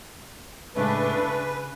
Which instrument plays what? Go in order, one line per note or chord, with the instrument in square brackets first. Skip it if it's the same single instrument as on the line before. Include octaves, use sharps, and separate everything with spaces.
[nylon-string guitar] A2 C#3 G#3 [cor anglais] A3 [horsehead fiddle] D4 [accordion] B4
[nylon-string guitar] C#3